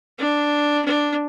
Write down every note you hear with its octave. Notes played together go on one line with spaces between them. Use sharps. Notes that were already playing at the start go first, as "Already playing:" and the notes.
D4
D4